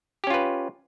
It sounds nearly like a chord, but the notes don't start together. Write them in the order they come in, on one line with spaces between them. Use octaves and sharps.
G4 C#4 F4 B4